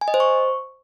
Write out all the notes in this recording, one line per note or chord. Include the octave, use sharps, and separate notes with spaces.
G#5
D#5
C5
C#6